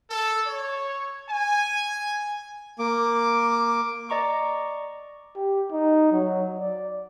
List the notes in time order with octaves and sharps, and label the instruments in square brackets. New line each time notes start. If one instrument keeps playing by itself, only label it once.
[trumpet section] A4
C#5
G#5
[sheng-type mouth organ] A#3 D6
[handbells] D5 D#5 A#5 C#6 D6
[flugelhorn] G4
D#4
F#3
D5